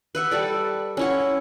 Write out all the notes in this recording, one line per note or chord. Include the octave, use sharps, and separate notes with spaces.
B4 E5 F#5
G3 A4 D5
C#4 E4 F#5